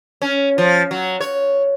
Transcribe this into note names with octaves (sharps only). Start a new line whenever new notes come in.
C#4
F3
F#3
C#5